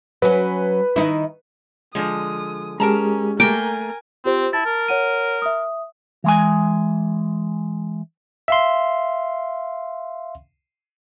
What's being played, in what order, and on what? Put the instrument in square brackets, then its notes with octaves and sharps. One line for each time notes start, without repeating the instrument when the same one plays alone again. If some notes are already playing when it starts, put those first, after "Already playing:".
[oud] F#3 C#4 [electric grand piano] B4
[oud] D#3 D#4 E4
[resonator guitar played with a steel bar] D3 F3 G#3 [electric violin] D#6
[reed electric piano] G#3 G4 G#4 [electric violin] C#4 [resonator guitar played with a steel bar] A#4 A5 A#5
[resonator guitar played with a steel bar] A3 A#3 [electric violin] A#4 G#5 [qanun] G5
[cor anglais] C4 [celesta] F4 G4 C5
[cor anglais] E4 [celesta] A5 A6
[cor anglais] A#4
[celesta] C#5 F#5 D#7
E5 D#6
[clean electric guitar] E3 G#3 G#5
[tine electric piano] E5 F5 C6